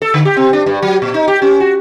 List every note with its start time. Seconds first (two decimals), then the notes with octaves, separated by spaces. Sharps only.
0.02 A4
0.14 D3
0.25 G4
0.37 C4
0.53 D4
0.66 G2
0.82 F#3
1.02 A#2
1.14 D#4
1.28 G4
1.42 C#4
1.60 F#4